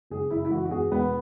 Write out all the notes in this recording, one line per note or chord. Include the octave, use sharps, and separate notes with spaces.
F#1 G#4
F#1 E4
E4
E3 F#4
F#4
E2 G#4
E1 B3